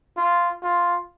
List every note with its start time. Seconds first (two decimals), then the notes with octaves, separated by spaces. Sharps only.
0.17 F4
0.63 F4